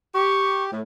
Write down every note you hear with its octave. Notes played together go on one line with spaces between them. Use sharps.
G4 C#6
A2